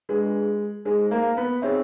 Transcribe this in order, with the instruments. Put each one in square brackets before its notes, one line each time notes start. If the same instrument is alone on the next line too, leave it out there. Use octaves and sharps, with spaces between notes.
[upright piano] G#3 [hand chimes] D4 F4 G#4 B4
[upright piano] G#3 [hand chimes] D#4 G#4 C5
[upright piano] A#3
B3
[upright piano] C4 [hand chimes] D#4 G#4 C#5 E5